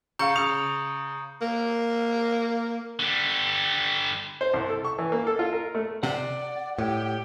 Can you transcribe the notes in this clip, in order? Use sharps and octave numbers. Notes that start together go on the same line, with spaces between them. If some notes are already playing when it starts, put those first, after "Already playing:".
C#3 F5 A#5 C#6 G6 C#7
C#3 D#6 F7
A#3
D3 G3
C5
C2
A4
C#6
E3
A#3
A4
F4
A#4
A3
C3 D5 F#5
A2 G4